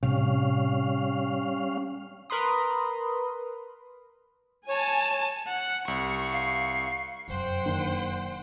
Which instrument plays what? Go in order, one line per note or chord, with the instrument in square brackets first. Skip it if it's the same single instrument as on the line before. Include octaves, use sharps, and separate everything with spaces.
[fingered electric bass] A2 C3 [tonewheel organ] G3 C#4 F5
[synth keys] A#4 B4 B5 C6 D#6
[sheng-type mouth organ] C#5 [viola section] G#5 A5
[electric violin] F#5
[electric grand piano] C2 [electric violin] C#6
[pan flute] F5
[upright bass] F1 F#2 [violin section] C5 F#5 G5
[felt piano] D#3 A#3 D4